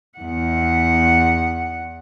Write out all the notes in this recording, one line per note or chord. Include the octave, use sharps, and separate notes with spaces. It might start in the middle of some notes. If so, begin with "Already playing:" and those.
E2 F#5